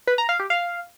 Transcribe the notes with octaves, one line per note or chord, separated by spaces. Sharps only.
B4
A#5
F5
G4
F5